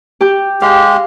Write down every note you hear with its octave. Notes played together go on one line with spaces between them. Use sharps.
G4 G6
G#3 G4 F5